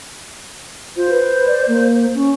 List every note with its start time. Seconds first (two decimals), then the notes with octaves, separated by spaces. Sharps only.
0.96 F4 C5
1.10 B4
1.47 D5
1.68 A#3
2.14 C#4